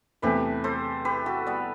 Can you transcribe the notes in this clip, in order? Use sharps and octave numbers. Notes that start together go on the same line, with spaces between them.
E2 C3 E3 A3 G4 B4
A4 C5
G4 B4
F#4 A4
G3 B3